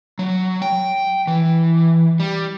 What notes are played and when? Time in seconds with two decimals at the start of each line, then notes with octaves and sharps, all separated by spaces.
0.19 F#3
0.62 G5
1.27 E3
2.20 G3